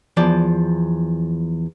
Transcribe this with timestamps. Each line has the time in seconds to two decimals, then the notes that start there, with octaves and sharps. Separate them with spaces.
0.17 E2 F3 D5